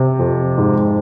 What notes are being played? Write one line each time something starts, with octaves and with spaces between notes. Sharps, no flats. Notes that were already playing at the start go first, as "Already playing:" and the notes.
Already playing: C3
F2
G#2